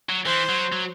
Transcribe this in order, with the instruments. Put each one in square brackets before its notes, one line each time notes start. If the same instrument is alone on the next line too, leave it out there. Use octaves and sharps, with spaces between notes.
[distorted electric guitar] F#3
[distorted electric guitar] E3 [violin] C5
[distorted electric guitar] F#3
F#3